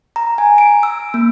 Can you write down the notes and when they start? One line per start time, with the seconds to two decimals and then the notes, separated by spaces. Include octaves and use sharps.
0.16 A#5
0.38 G#5
0.58 D7
0.83 E6
1.14 A#3